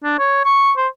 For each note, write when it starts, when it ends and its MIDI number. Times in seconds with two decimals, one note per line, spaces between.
0.04 0.16 62
0.19 0.42 73
0.45 0.72 85
0.77 0.88 72